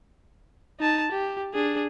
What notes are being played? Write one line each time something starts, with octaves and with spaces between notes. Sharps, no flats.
D#4 A5
G4
D4 G#4